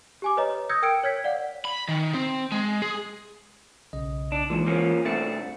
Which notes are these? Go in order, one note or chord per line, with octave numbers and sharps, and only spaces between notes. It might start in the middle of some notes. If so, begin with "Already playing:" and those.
G4 G#5 D6
B4 C#5 D#5 A#5
D#6 E6 G6 G#6 A#6 C#7
A#4 G5 E6 F6 C#7 D7
C#5 F6 G#6 B6
D5 F5 F#5
B5
D#3
C4
G#3
G#4
B1 C#3 D#5
D4
D#2 A#2 E3 G#3
F3 A#3 C#4
C2 A3 C4 D4 A6 C#7